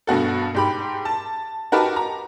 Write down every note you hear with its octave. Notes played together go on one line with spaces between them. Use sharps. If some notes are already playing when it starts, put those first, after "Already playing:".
G2 B2 F#4 A4
G#2 G4 B5
A5
D#4 F#4 G4 A#4 B4 A5
A#5